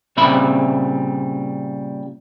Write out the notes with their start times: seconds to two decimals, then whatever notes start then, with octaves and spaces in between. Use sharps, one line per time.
0.17 A#2 C#3 G3 C4 E5 B5